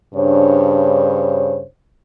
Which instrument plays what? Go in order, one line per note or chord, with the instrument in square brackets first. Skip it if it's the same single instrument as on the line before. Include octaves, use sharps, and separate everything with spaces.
[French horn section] G2 C#3 D4 C5 C#5